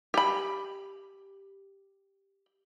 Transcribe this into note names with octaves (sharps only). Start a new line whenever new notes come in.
G4 B5